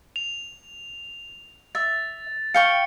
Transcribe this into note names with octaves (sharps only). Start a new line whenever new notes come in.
F7
E5 A6
F5 G5 C#6 C#7